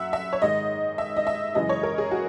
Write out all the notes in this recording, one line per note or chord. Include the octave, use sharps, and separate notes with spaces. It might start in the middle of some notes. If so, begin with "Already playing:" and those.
Already playing: F#2 E5 F#5
E5
C#5
G#2 D#3 G#3 D#5
E5
D#5
E5
F#2 C#3 E3 G#3 D#5
C#5
A#4
G#4
F#4